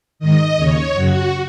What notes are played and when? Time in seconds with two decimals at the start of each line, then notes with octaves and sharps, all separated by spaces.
0.19 G#2 D#3 D#5
0.56 D#2 C#3 C#5
0.93 F#2 C#3 F#4